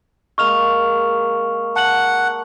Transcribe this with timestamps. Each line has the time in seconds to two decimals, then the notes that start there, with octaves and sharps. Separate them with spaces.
0.38 G#3 A#3 C#6 F6 F7
1.76 F#5 A5 F#7